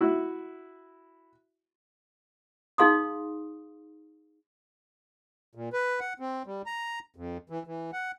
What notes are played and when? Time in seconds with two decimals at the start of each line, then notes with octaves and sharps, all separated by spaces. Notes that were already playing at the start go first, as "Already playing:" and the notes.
0.01 E4 F#4
2.78 D#4 G#4 F5 C6 D#6
5.55 A#2
5.73 B4
6.00 F#5
6.20 C4
6.46 G3
6.66 A#5
7.16 F2
7.50 E3
7.67 E3
7.93 F#5